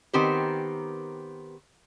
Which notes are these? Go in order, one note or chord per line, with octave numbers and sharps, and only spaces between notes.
D#3 B3 C4 G4 A#4 C5